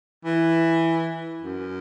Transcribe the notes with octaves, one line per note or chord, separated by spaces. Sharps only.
E3
F#2